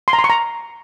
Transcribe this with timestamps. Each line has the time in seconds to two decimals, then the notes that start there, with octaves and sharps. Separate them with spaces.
0.08 C6
0.13 A#5
0.19 C6
0.24 C#6
0.30 A#5